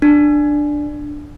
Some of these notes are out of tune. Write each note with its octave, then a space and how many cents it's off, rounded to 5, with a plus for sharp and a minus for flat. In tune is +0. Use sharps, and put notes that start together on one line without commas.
D4 +5